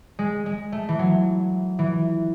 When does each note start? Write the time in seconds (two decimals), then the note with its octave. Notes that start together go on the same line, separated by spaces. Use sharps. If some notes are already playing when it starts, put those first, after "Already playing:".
0.19 G#3
0.46 G#3
0.72 A3
0.89 E3
0.99 F#3
1.79 E3